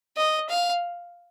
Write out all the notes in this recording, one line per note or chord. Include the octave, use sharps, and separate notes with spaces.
D#5
F5